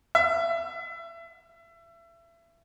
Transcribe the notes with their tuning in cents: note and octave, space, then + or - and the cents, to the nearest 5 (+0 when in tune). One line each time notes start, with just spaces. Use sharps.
E5 +30